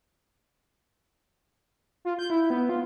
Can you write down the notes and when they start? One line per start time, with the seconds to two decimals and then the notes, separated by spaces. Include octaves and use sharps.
2.05 F4
2.19 G6
2.30 E4
2.50 B3
2.69 F4